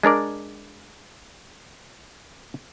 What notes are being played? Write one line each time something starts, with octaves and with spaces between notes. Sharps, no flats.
G#3 D4 A#4 D5